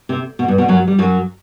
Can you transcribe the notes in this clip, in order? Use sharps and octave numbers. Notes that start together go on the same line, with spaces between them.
C3
B2
G2
B2
F#2 F#3
G3
F#2 F#3